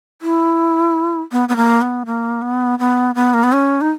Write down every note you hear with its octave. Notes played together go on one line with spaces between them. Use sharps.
E4
B3
B3
A#3
B3
A#3
B3
B3
B3
A#3
B3
C#4
D#4